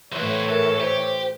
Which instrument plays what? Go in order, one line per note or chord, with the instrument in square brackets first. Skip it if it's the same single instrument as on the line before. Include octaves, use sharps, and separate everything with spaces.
[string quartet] A2 E3 [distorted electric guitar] F#3 C5 [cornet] C#5
[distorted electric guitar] A4 [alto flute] A#4
[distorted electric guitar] G4 [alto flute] C5